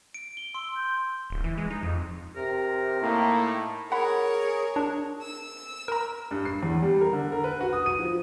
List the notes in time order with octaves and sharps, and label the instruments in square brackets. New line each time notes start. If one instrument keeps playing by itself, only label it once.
[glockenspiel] D7
G7
[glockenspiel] C6 [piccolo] E6
[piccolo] G6
[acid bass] D1
E3
G#3
D#4
F2
[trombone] C3 [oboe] A#4
[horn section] A2 D#4 [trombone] A#3
[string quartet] G#4 A#4 C#5 [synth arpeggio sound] F#5 B5
[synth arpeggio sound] D4
[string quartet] E6
[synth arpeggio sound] A#4 A#5
[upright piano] G2
C7
E2
G3
A#4
D3
A#4
B4
F#4
D#6
D#7
F3